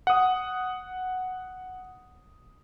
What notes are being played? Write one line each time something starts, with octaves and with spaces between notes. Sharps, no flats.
F#5 D#6